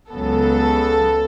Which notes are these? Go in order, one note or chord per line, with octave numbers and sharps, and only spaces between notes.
C#2 C#3 F#3 B3 A4